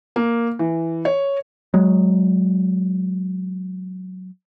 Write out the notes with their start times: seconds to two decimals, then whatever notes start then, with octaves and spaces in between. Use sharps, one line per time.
0.16 A#3
0.59 E3
1.05 C#5
1.74 F#3 G#3